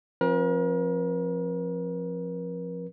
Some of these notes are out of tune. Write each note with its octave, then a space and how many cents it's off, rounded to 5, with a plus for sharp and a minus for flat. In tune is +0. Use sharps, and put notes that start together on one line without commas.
F3 +0 C4 +35 A#4 +40